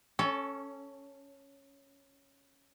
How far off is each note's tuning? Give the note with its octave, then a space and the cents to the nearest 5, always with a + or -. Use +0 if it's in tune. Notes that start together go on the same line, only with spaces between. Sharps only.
C#4 -5 A4 +0 C#5 +25